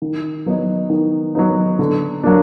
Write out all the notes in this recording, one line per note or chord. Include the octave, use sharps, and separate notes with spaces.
D#3
F#3 B3 D#4
D#3
F#3 B3 D#4
D3
F#3 A#3 D4